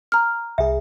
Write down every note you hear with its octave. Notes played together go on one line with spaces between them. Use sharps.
A#5 F6
C2 G#4 E5